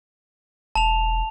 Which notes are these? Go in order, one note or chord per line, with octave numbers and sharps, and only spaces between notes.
E1 A5 F7